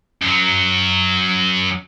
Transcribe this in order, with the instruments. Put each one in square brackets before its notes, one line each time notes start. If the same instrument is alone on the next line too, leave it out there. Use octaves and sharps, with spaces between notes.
[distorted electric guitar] F#2 F#3